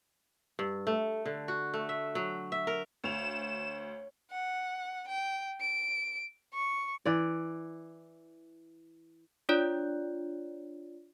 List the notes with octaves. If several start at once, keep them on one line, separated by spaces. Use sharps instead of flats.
G2
A3
D3
F#4
A3
E5
F#3
E5
A#4
D2 C#5 F5 E7 F7
F#5
G5
D7
C#6
E3 D5
D4 F4 C#5 D5